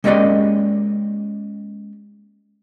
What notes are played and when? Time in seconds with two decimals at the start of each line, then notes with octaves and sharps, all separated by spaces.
0.04 G#3 A#3 C#4 G4 D5 D#5